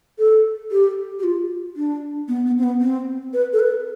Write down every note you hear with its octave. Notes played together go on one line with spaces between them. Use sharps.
A4
G4
G4
F4
D4
B3
B3
C4
B3
C4
B4
A4
B4